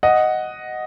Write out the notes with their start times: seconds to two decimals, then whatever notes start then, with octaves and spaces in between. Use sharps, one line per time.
0.03 D#5 F#5